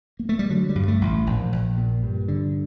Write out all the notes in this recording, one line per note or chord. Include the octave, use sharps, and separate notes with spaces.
A#3
A3
G3
D3 F#3
G3
G2
A3
A1
A#1
A#1
A#2
G2
D3